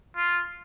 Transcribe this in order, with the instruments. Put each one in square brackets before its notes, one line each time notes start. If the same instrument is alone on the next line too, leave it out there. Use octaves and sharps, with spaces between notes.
[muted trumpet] F4